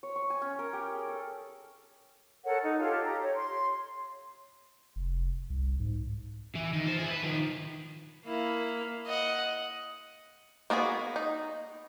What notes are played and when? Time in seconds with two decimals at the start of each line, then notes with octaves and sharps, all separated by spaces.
0.03 C#5
0.16 C#6
0.30 G#5
0.42 C#4
0.59 A#4
0.73 G4
0.94 G#4
1.09 A4
2.45 A4 A#4 C#5 F#5
2.62 D#4
2.79 F4 G4 A4 C#5
3.05 G4 A#5
3.22 C#5
3.35 C6
4.96 F1
5.50 C2
5.80 G#2
6.56 E3
6.73 D#3
6.85 F4 C5
6.99 E4 G#4
7.11 B4
7.23 D#3 F3
8.25 A#3 E4
9.06 D#5 F#5
10.70 A#3 B3 F#4 G#4
11.16 D#4